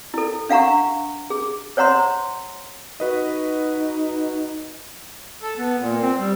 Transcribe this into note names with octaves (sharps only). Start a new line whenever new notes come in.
E4 A4
D4 F5 F#5 A#5 C#6
G#4
C5 C#5 F#5 A#5 C6
D#4 F#4 B4 D#5
A4
B3
A#2
C4
G3